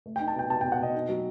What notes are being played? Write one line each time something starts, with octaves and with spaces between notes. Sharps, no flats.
A3
D#4 G5
A5
B2 G5
B2 A5
B2 G5
F#5
B2 D#5
D#4
F#3